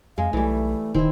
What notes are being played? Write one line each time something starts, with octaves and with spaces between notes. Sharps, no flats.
F2 G#3 F5
B1 E3 G3 A3
D#1 D#3 C4 E4